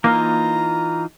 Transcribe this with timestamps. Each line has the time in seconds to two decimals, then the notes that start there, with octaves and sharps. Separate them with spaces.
0.04 E3 A#3 D#4 F4 A#5